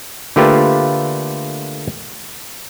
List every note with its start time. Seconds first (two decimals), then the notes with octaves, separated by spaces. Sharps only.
0.36 D3 A3 A#3 F4 G4 B4